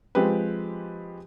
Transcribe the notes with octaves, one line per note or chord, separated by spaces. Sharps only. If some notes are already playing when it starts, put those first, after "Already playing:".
F3 G#3 C4 G4 B4